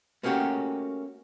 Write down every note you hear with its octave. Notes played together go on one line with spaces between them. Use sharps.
A3 A#3 C#4 F#4 G4